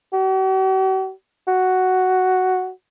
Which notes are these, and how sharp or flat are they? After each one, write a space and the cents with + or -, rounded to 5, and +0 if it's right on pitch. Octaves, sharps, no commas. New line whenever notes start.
F#4 +45
F#4 +5